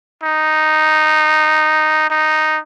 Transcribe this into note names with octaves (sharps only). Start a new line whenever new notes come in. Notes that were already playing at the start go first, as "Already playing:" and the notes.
D#4
D#4